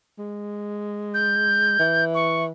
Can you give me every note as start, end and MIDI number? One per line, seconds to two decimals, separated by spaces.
0.19 1.78 56
1.14 2.05 91
1.79 2.52 52
2.15 2.44 85